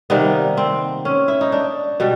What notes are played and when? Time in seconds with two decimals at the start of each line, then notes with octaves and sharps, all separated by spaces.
0.10 C3 D#3 G3 A#3 B3
0.57 C4
1.05 C#4
1.28 E4
1.41 D#4
1.52 D4
2.00 B2 G3